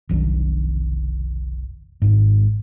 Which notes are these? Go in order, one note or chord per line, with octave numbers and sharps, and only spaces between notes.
F1 B1 D#3 D4
G#1 G#2